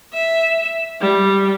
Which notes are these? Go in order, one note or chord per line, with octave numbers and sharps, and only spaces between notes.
E5
G3